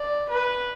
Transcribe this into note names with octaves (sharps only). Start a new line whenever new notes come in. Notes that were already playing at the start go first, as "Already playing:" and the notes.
Already playing: D5
B4